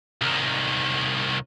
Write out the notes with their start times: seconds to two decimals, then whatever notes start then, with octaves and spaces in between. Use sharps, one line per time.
0.21 C2 D#3